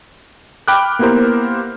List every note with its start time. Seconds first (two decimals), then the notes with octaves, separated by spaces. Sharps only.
0.68 G5 B5 D6 F6 F#6
0.99 A#3 B3 E4 G4 A#4 C5